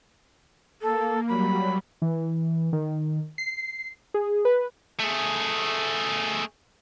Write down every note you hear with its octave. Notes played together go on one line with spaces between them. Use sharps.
A#3 A4
F#3 G3 B5
E3
D#3
C7
G#4
B4
A3 G#4